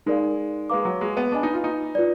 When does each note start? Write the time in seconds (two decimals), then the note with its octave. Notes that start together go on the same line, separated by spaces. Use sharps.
0.06 G#3 D#4 A#4 D5 F5
0.70 G#3 B4 F5 A#5 D6
0.85 F#3
1.01 G#3
1.17 B3
1.32 D4 B4 D#5 G#5 B5
1.43 D#4
1.54 F4
1.64 D#4
1.95 F4 B4 D5